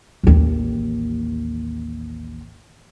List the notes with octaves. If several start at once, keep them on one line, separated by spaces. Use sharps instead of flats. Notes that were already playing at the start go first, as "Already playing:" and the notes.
A1 D#2